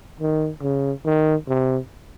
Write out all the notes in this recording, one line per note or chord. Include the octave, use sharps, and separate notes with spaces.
D#3
C#3
D#3
C3